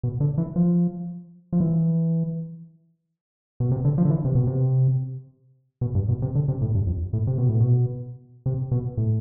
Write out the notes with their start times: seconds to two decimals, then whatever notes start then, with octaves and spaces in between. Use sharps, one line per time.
0.03 B2
0.20 D3
0.38 E3
0.56 F3
1.53 F3
1.60 E3
3.60 B2
3.71 C3
3.85 D3
3.98 F3
4.05 D3
4.10 E3
4.25 C3
4.35 B2
4.47 C3
5.81 B2
5.95 G2
6.09 B2
6.22 C3
6.35 D3
6.48 C3
6.61 A2
6.75 G2
6.87 F2
7.13 A2
7.27 C3
7.38 B2
7.49 A2
7.60 B2
8.46 C3
8.71 B2
8.97 A2